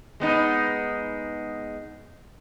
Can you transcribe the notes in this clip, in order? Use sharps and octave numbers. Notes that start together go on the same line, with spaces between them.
G#3 B3 D#4